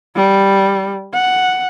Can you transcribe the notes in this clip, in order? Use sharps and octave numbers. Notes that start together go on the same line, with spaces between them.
G3
F#5